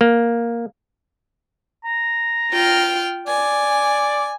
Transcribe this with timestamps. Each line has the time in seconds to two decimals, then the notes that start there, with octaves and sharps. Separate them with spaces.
0.01 A#3
1.84 A#5
2.52 F4 G5 F6
3.27 D5 G#5